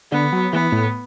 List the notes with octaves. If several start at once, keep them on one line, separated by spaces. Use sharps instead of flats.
D3 B3
F#3
E3 B3
A2